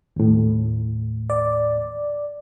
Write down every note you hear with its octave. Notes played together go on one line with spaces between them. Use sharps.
D#2 A2
D5